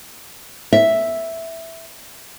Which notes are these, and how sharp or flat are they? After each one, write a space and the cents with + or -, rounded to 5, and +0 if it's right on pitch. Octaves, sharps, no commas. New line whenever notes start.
E5 +0